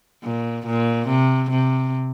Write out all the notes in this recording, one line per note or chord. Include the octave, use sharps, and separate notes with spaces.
A#2
A#2
C3
C3